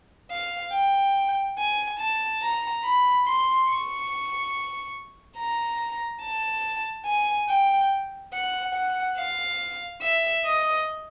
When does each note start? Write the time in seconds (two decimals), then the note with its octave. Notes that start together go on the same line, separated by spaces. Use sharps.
0.31 F5
0.73 G5
1.58 G#5
1.99 A5
2.42 A#5
2.84 B5
3.26 C6
3.69 C#6
5.37 A#5
6.21 A5
7.06 G#5
7.49 G5
8.33 F#5
8.75 F#5
9.18 F5
10.01 E5
10.44 D#5